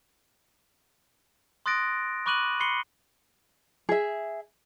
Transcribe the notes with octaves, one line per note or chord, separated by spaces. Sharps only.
C6 D#6 F#6 A6 A#6 D7
B5 C#6 D6 F#6 D#7 F#7
B5 C6 C7 C#7 G7
G#4 E5